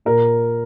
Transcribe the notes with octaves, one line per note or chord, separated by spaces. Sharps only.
A#2 A#4